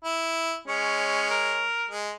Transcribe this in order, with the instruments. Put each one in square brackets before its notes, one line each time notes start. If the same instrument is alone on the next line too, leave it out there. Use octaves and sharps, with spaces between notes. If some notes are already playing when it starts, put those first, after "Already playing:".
[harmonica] E4
[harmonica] G#3 C#5 [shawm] C#4
[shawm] A#4
[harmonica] G#3